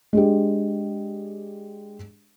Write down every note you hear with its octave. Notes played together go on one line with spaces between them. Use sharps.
G#3 D4 G4